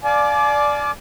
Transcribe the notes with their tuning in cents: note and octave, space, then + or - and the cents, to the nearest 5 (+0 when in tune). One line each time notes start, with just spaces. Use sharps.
D5 +0 F5 +0 G#5 +45